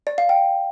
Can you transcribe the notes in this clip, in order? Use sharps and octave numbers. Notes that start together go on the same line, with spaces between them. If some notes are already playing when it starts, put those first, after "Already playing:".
D5
F5
G5